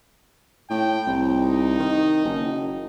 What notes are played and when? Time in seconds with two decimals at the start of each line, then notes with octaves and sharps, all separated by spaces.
0.70 A2 G5
1.07 C2
1.38 D#4
1.79 D#3
2.25 F#1